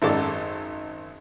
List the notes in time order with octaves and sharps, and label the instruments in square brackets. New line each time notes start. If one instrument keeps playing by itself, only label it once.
[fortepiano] G#1 F#2 G#3 A4 D5